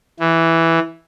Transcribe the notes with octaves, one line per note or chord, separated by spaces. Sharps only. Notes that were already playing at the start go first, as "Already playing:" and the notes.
E3